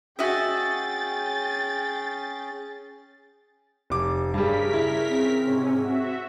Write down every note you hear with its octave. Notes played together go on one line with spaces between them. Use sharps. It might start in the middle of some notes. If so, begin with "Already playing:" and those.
C#4 F#4 G#4 D#5 E5 G5 A6
F1 D6
G2 C#3 G3 G#4 A#4 B6
E4
C4
G#2 C3 C#4
F#4 E5